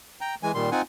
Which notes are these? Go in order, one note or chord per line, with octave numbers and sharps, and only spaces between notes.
G5 A#5
E3 G#3 G#5
A#2 D#3 G3 C6
C4 D#4 F4 F#5 G#5